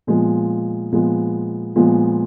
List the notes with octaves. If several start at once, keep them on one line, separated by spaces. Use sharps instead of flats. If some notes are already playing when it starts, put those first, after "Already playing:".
A#2 F3 G#3 B3
A#2 F3 G#3 B3
A#2 F3 G#3 B3